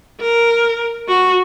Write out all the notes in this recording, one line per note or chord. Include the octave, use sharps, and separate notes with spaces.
A#4
F#4